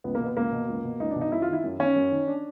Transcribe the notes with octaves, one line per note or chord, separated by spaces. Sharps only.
C#2 B3
A#3
B2
B3
C#2 A#3
B2
C#2
B2
C#2 D#4
D4
B2
D#4
F#2 E4
F4
D#3 E4
F#2
D#3 C#4
F#2
D#3
D4